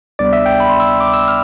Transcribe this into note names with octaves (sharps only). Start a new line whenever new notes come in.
D2 C3 G3 B3 D4 D5
E5
G5
B5
C6
E6
D6
E6
F6